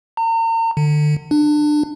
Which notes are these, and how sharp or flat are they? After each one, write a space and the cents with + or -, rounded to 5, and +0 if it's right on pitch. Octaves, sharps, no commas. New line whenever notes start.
A#5 -40
D3 +30
D4 +25